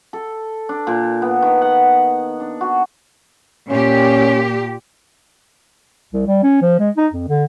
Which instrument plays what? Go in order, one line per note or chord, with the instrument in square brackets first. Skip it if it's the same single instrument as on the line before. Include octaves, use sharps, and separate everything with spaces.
[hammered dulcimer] A4
D4
A#2
B3
D#3
F#5
D4
F#4
[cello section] A#2 G4 [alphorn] C#4
[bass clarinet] C2
G3
C#4
F3
G#3
D#4
F2
D3